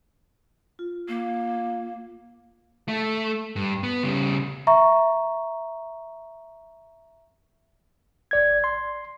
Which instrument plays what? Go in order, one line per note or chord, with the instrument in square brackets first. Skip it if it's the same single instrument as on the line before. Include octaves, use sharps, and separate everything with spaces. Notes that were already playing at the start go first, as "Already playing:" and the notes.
[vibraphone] F4
[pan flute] A#3
[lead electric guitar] A3
G2
B3
C#3 G3
[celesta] E5 A#5 C#6
[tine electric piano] G1 D5 G#6
C6